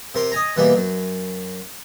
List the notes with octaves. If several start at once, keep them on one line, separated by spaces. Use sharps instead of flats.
C3 A#4 C6
D#5 G#5 A#5
B2 E3 G3 A#3
F#2